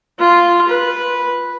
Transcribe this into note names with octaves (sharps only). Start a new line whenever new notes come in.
F4
B4